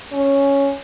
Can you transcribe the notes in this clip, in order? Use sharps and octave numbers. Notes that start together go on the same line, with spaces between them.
C#4